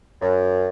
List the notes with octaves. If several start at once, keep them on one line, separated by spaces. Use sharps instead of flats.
F#2